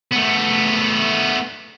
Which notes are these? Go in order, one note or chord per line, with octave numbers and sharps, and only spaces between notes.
A3 B3